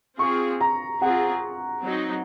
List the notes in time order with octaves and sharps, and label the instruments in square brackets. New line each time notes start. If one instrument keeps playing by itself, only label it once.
[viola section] C4 F4 G#4 [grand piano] C#6
[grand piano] A#5
[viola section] C4 F4 G#4 [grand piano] F#5
[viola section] F#3 C4 D#4